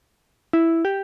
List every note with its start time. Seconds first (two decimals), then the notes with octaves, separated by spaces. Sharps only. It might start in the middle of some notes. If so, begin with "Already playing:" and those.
0.53 E4
0.85 G4